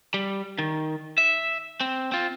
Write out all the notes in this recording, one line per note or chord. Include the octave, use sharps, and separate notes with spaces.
G3
D#3
E5
C4
C4 F4